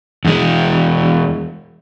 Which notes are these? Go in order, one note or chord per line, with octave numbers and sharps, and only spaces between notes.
E2 G#3